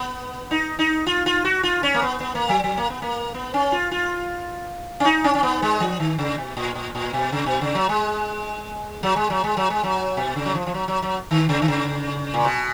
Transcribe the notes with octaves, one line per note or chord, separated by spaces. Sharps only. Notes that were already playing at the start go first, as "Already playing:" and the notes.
Already playing: B3
D#4
D#4
F4
F4
F#4
F4
C#4
A#3
B3
B3
A#3
F#3
F#3
A#3
B3
A#3
B3
C#4
F4
F4
C#4
D#4
C#4
C#4
B3
G#3
F3
D#3
C#3
B2
A#2
A#2
A#2
B2
C#3
B2
C#3
F#3
G#3
F#3
G#3
F#3
G#3
F#3
G#3
F#3
B2
C#3
F#3
F3
F3
F#3
F#3
F#3
D#3
C#3
D#3
C#3
A#2
B2